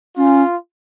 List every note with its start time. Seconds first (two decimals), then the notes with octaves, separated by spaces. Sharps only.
0.17 C#4 F4